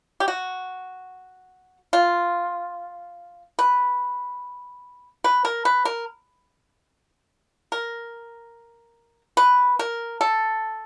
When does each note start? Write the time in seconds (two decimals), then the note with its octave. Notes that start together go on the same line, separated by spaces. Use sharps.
0.20 G4
0.28 F#4
1.93 F4
3.59 B4
5.24 B4
5.45 A#4
5.65 B4
5.85 A#4
7.72 A#4
9.37 B4
9.79 A#4
10.21 A4